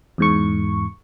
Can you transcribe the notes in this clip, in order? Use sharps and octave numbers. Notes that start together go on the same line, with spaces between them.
E2 G#2 C#6